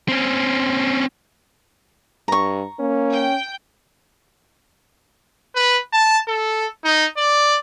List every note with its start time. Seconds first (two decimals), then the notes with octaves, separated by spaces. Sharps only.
0.08 C4 C#4
2.28 G2 A#5 C#6
2.79 A#3 C#4
3.13 G5
5.55 B4
5.93 A5
6.28 A4
6.84 D#4
7.17 D5